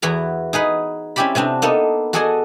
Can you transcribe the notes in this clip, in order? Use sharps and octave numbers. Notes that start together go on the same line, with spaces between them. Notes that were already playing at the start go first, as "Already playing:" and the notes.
E2 B3 E4 F#4 A#5
D#4 G#4 B4 F#5
C4 C#4 E4 G4 D5 B5
C3 B3 C4 D4
A#3 B3 D#4 A4 D#5
F#4 G#4 A4 D5 D#5 G#5